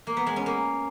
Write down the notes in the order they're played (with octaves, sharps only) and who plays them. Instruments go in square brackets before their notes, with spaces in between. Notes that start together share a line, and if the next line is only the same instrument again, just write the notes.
[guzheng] A#3
B3
G#3
C#4
A#3